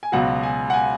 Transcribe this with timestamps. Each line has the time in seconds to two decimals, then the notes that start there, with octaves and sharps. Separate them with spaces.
0.03 G#5
0.12 C#2 B2 F#3 F#5
0.43 G#5
0.70 F#5
0.74 G#5